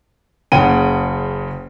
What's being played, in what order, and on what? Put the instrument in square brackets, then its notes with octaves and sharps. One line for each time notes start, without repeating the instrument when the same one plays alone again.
[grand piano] F#1 C#3 F#5 G5 D#7